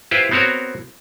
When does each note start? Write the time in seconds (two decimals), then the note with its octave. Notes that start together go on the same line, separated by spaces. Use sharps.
0.11 E4 F4 G4 B4 C5
0.31 B3 C4 F#4 A#4 C#5